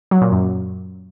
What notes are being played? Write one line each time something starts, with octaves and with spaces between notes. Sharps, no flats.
F#3
A#2
F#2